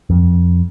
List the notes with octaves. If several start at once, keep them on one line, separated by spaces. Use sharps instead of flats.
F2